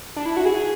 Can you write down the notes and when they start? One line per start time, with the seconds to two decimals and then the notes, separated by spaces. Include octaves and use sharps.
0.16 D4
0.26 E4
0.37 F#4
0.46 G#4